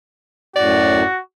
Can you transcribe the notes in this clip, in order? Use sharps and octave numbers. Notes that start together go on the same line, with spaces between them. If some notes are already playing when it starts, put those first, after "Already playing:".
F#2 A2 F#4 D5